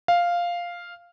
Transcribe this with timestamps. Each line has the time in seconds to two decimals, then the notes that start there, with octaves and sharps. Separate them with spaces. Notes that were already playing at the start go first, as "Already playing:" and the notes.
0.08 F5